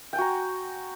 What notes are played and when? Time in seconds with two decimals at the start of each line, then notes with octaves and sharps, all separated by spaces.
0.13 G5
0.16 G#5
0.18 F#4
0.21 A#5